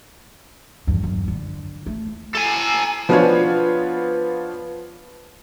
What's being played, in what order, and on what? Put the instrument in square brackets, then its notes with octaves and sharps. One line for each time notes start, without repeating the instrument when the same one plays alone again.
[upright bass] E2 G2
G1 F#2
D3
A3
[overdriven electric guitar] A4 G#5
[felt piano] F3 B3 D4 F4 B4 C#5